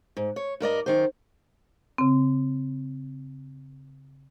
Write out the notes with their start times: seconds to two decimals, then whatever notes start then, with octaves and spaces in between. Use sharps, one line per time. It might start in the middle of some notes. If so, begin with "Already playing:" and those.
0.17 G#2
0.36 C#5
0.60 G2 A#4 D5 D#5
0.86 F#2 D#3 C5
1.98 C#3 C4